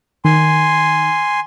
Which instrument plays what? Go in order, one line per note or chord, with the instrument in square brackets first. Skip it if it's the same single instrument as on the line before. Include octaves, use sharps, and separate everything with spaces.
[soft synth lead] D#3 [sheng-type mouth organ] G#5 C6